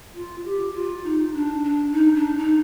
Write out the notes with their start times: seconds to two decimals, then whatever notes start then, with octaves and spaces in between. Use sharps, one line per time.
0.15 F4
0.44 G4
0.74 F4
1.04 D#4
1.33 D4
1.64 D4
1.92 D#4
2.15 D4
2.38 D#4